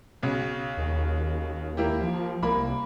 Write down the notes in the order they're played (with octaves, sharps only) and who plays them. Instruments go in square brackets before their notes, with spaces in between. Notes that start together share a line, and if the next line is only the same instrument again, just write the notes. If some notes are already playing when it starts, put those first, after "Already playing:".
[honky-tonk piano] B1 C#3
[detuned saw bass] D#2
[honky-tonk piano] A#3 E4 G4
[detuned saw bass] F3
[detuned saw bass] C2 [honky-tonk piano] A#3 B5